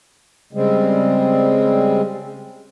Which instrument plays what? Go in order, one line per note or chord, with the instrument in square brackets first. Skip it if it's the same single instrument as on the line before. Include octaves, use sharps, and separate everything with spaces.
[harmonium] C#3 G3 G#3 C4